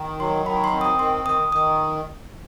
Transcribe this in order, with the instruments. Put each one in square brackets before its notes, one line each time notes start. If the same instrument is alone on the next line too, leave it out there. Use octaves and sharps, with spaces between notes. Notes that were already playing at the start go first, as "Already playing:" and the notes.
Already playing: [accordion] D#3
[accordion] F#3 [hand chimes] C6
[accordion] D#3 [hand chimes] B5
[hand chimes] C6
[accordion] C4
[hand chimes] D#6
[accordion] D#3 [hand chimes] C6
[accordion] D#3 [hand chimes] D#6
[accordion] D#3 [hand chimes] D#6